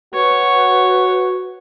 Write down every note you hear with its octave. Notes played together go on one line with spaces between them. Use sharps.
F#4 B4 C#5